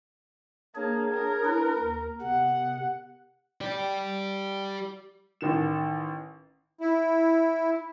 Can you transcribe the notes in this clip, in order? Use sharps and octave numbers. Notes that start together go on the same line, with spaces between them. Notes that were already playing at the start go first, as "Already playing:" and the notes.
A#3 D4 G#4 C#5
A#4
D4 E4 B4
D#2
C3 B3 F#5
G4 D5
A1 D#3 E7
E4